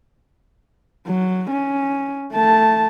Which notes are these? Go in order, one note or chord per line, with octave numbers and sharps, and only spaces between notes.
F#3
C#4
A3 A5